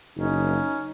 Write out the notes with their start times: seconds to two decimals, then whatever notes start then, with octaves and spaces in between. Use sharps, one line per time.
0.17 F#1 C#4 D#4